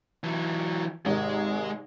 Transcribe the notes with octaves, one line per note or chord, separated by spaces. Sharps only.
E3 F#3
G#1 C3 G#3 A#4